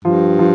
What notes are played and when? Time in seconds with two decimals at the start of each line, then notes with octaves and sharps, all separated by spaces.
0.05 G2 F3
0.39 F3